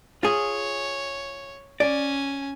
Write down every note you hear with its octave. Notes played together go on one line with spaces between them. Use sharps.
F4 G#4 C#5
C#4 D5 G#5